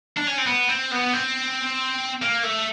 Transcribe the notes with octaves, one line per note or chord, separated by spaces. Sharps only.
D4
C#4
C4
B3
C4
B3
C4
A#3
A3